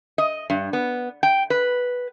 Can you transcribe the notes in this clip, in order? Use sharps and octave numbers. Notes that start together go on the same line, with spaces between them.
D#5
G2
B3
G5
B4